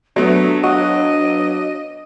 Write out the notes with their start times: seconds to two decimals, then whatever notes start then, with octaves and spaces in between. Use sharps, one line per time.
0.16 F#3 A3 B3 D4
0.64 F#4 D#5